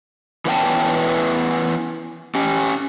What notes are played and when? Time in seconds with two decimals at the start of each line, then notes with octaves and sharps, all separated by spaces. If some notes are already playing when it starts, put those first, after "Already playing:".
0.45 E3 B3 C#4 G5 A5
2.35 C#4 G4